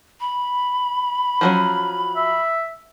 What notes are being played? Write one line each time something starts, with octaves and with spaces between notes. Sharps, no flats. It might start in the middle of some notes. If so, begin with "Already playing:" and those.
B5
F3 F#3 C#4
E5